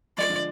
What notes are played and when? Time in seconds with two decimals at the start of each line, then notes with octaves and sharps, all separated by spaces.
0.17 F3 G#3 D5
0.29 D3 F3